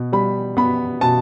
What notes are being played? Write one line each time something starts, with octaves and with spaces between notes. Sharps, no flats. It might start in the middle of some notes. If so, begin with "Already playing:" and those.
Already playing: B2
G3 B5
B3 B5
B2 A5